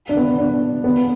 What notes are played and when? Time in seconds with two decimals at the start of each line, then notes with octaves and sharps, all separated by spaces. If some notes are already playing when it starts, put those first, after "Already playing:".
0.09 D4
0.17 B3
0.39 D4
0.84 B3